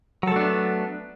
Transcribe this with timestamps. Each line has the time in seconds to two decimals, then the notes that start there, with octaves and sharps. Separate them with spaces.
0.23 F#3
0.27 A4
0.32 A3
0.36 D4
0.40 B3